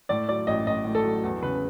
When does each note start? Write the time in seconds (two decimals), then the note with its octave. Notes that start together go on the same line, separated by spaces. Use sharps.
0.09 A2 D5
0.29 F#3 D5
0.47 A1 D#5
0.67 A1 D#5
0.85 A2
0.95 A4
1.04 F#3
1.23 E2
1.42 C#3 B4